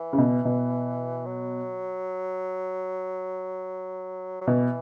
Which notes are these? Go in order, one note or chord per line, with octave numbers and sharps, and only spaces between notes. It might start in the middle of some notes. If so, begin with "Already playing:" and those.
Already playing: E3
C#3
B2
B2
F#3
F#3
B2 E3